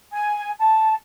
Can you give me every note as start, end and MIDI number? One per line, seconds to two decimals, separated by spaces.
0.11 0.50 80
0.58 0.93 81